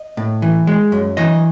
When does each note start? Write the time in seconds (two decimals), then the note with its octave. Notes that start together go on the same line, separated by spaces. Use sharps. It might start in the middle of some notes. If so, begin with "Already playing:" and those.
Already playing: D#5
0.17 A2
0.42 E3
0.67 G#3
0.92 F#2
1.17 E3 D#5